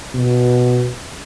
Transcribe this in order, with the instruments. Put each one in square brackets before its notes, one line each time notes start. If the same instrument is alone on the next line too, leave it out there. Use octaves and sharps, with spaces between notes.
[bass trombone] B2